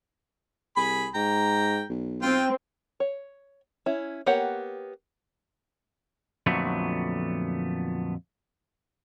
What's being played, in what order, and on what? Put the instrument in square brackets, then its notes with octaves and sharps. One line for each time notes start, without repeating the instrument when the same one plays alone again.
[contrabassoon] C2 [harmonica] G#4 B5
[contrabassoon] G#2 [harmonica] G5 A#5
[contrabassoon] B1
[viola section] C4 [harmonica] F4 G5
[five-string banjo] C#5
C#4 E4
A#3 B3 G4 C#5 F#5
[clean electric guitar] F2 A#2 D3 F#3 A3 B3